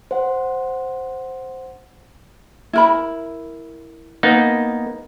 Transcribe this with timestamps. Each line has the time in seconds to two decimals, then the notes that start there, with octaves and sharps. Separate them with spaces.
0.11 C5 F#5
2.73 E4 A#4 B5
4.23 A#3 B3 D#4